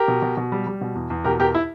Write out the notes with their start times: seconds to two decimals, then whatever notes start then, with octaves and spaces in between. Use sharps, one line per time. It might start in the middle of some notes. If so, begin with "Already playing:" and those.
Already playing: G4 A#4
0.08 B2
0.22 B2
0.37 B2
0.52 G3
0.67 G3
0.81 B2
0.95 E2
1.10 E2
1.24 B2 G4 A#4
1.39 E2 G4 A#4
1.55 E4